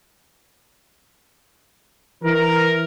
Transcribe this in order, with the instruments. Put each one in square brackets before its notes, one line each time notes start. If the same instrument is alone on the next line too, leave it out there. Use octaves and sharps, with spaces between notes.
[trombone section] E3 [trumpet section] A#4